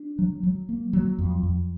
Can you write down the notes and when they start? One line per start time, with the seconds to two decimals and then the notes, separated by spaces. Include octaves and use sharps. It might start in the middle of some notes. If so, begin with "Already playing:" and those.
Already playing: D4
0.19 F#3
0.43 F#3
0.69 A#3
0.93 F#3
1.18 F2
1.43 F2